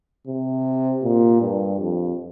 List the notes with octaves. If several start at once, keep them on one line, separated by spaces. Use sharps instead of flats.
C3
A#2
G2
F2